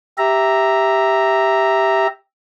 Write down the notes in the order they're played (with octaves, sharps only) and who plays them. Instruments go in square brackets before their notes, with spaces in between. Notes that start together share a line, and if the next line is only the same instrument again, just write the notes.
[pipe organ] G4 E5 A#5